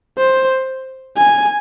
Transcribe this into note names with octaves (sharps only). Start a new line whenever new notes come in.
C5
G#5